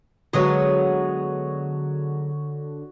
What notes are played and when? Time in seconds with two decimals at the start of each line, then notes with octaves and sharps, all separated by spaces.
0.33 D3 F#3 G#3 B3 F#4 C#5 D#6